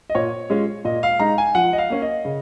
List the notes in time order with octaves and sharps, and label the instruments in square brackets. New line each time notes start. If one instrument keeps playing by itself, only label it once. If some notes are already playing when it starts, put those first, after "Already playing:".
[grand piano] D#5
A#2 C#5
G#3 C#4 F4
A#2 D#5
F5
G#3 D#4 A#5
G#5
F3 F#5
D#5
F5
A#3 C#4
D#5
C#3